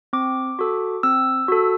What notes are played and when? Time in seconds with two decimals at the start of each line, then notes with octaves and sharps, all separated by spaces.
0.13 C4 D6
0.59 F#4 A4
1.03 C4 E6
1.48 F#4 A4